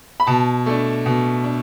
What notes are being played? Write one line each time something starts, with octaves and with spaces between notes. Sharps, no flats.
B5
B2 A5
A3 D4
B2
D4